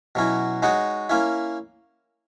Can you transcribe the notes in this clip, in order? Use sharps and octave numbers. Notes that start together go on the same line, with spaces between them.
B2 F#3 C#4 E4
G#3 D#4 F#4 C#5
A#3 C#4 E4